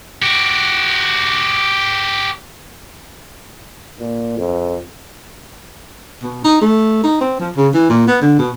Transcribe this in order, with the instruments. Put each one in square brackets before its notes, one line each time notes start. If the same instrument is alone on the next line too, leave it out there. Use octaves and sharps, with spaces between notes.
[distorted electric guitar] F#4 G4
[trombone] A#2
F2
[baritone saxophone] B2
D#4
A3
D#4
C4
F3
C#3
E3
A#2
B3
D3
B2